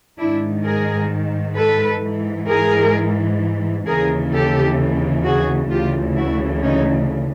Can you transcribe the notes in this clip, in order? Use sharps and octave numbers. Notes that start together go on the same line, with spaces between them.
G#2 D#3 D4 E4
G#4 A#4
A4 B4
G#2 E3
G#4 A#4
D#2 C#3 E3 G#4 A#4
G4 A4
F#4 G#4
D2 C#3 E3 F4 G4
E4 F#4
C#4 D#4